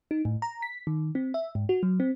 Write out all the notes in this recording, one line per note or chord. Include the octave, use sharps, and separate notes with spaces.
D#4
A2
A#5
B6
D#3
C4
E5
G#2
F#4
F#3
C4